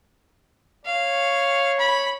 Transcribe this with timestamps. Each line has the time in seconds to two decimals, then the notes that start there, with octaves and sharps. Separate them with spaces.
0.85 C#5 F5
1.79 B5